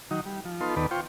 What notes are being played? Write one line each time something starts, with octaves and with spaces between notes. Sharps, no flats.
D#3 F#3 D#4
G3
F3
B3 D#4 F4 A4 C6
D#2 D#3 B3 A4 B4 D5
F4 C5 G5 C#6